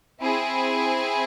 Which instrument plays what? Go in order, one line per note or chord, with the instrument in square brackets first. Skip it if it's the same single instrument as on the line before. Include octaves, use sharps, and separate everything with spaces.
[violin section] C4 E4 G#4